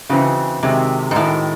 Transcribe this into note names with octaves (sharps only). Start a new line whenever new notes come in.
C#3 E3 C4 D#4 F#4
C3 D#3 G#3 C4 F#4
G#2
A2 D#3 G#3 C4 F#4